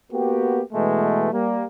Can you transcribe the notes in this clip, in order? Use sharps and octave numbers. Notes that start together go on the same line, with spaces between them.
A#3 B3 F#4 G4
B2 E3 G#3 A3
G3 A#3